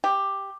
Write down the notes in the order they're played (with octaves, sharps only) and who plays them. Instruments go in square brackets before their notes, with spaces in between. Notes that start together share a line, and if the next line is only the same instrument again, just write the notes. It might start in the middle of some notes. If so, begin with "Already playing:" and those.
[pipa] G4